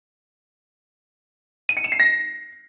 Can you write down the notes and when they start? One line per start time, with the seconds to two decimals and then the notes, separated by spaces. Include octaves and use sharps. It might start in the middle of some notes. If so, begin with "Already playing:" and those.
1.69 D#7
1.77 C#7
1.84 E7
1.92 C7
2.00 A#6